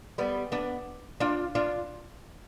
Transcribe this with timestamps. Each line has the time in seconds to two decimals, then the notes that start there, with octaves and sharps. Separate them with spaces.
0.18 G3 B3
0.52 B3 D4
1.20 D4 F4
1.55 D4 F4